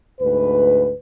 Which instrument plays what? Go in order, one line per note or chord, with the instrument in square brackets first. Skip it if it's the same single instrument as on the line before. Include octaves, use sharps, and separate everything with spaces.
[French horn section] D2 G#2 B4